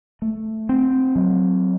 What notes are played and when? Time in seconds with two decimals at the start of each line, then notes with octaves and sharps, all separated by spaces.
0.22 A3
0.69 C4
1.15 F#3